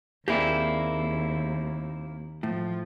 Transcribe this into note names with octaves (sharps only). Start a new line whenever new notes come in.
D#2 A#3 C4 E4 G4 G#4 D5
A2 F3